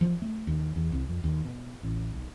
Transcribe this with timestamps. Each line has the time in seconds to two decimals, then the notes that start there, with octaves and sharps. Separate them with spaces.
0.01 F3
0.22 A3
0.47 D#2
0.76 E2
0.92 C2
1.09 F2
1.24 D#2
1.45 B2
1.83 A1
2.14 B1